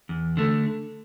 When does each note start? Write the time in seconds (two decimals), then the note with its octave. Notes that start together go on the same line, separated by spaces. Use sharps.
0.09 E2
0.37 D3 A3